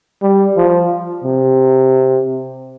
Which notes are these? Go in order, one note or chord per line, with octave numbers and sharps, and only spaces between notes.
G3
F3
C3